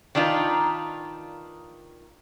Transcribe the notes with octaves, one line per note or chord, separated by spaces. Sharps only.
D#3 D4 D#4 F4 B4